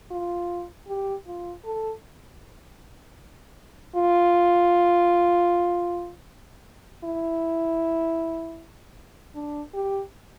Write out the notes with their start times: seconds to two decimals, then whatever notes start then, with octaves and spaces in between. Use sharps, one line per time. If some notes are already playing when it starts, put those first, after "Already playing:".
0.11 F4
0.88 G4
1.27 F4
1.65 A4
3.96 F4
7.04 E4
9.35 D4
9.74 G4